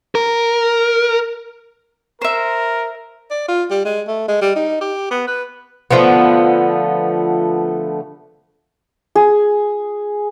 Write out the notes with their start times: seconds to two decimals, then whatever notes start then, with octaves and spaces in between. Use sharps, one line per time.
0.15 A#4
2.22 A#4 C5 E5
3.31 D5
3.48 F4
3.70 G3
3.85 G#3
4.08 A3
4.28 G#3
4.42 G3
4.56 D#4
4.81 G4
5.11 B3
5.27 B4
5.91 D3 F3 A3 B3
9.16 G#4